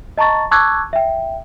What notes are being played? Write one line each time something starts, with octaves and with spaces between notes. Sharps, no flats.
D#5 A5 A#5 C#6 A6
A5 C#6 D6 E6 F#6 G#6
E5 G5